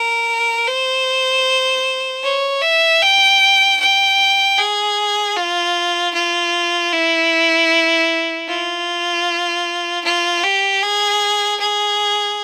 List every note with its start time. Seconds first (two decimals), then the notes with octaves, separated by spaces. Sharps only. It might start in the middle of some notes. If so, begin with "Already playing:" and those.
Already playing: A#4
0.68 C5
2.24 C#5
2.62 E5
3.02 G5
3.80 G5
4.57 G#4
5.36 F4
6.14 F4
6.92 E4
8.48 F4
10.04 F4
10.43 G4
10.83 G#4
11.60 G#4